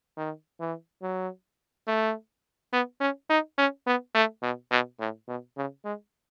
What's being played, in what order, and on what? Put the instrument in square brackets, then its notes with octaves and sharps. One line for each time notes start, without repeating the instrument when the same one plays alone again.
[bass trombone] D#3
E3
F#3
A3
B3
C#4
D#4
C#4
B3
A3
B2
B2
A2
B2
C#3
G#3